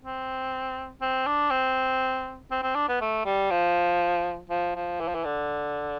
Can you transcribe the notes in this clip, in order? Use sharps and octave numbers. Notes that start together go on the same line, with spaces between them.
C4
C4
D4
C4
C4
C4
D4
B3
A3
G3
F3
F3
F3
E3
F3
E3
D3